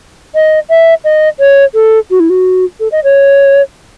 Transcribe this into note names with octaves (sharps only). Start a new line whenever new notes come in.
D#5
E5
D#5
C#5
A4
F#4
E4
F#4
A4
D#5
C#5